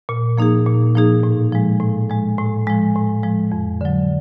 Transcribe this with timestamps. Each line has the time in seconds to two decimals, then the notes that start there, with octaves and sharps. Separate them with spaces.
0.09 A#2
0.38 F3 A#3 D#4 G#4
0.66 A#2
0.95 F3 A#3 D#4 G#4
1.23 A2
1.52 F3 G#3
1.80 A2
2.10 F3 G#3
2.38 A2
2.67 F3 G#3
2.95 A2
3.23 F3 G#3
3.52 F2
3.81 D3 F#3